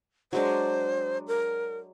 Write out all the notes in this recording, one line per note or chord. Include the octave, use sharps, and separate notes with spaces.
F#3 G#3 D4 C5
A#4